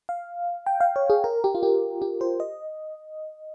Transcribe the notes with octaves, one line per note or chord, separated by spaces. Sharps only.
F5
G5
F5
C#5
G#4
A#4
G4
F4
G4
G4
C5
D#5